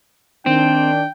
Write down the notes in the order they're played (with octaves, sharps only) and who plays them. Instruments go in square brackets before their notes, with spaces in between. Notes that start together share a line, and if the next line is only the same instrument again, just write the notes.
[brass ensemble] D#3 D4 [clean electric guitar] C4 [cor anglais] G5